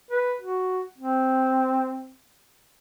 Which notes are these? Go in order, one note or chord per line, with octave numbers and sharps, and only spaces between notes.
B4
F#4
C4